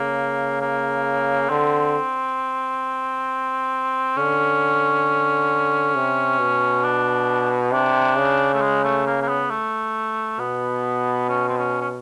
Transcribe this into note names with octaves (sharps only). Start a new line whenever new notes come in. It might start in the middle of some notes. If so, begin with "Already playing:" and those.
Already playing: C#3 A#3
A#3
D3 C4
D3 C#4
C3
B2
D4
C3 D4
C#3
A3
G#3
A3
A#3
A#3
B3
A3
B2 B3
C#4
C4
C#4
C#4